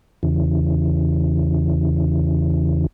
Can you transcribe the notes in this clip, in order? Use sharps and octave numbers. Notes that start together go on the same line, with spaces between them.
E2 C#3 E3